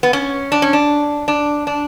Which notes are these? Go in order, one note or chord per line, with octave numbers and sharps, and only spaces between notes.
B3
C#4
D4
C#4
D4
D4
D4